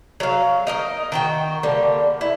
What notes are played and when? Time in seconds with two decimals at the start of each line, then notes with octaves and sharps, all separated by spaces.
0.20 F#3 F5
0.67 D#4 A#4 D#5
1.12 D#3 F#4 G5
1.63 D3 G3 A#3
2.21 E4